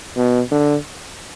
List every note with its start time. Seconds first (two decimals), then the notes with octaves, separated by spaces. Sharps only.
0.16 B2
0.52 D3